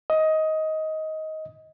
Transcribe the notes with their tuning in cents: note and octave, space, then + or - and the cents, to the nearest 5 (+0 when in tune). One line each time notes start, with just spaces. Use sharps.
D#5 +15